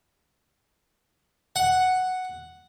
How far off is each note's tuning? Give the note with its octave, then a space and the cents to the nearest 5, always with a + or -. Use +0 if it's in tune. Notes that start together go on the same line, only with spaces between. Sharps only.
F#5 +0